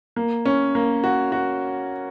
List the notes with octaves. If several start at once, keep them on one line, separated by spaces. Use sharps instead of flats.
A#3
C#4
A#3
F#4
F#4